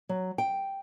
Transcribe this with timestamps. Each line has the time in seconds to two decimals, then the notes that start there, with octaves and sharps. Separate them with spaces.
0.09 F#3
0.38 G5